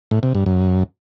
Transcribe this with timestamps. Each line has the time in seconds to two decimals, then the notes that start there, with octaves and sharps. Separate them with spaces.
0.11 A2
0.23 C3
0.35 G2
0.46 F#2